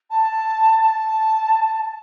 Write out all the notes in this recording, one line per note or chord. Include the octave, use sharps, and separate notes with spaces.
A5
A5